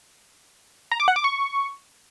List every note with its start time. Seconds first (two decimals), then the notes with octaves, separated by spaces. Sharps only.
0.92 A#5
1.00 D6
1.08 F#5
1.16 D6
1.24 C#6